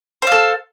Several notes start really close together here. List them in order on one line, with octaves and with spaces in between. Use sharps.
C5 F5 A4